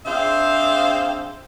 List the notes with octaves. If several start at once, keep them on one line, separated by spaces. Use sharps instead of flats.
C4 D4 G#4 C5 E5 F5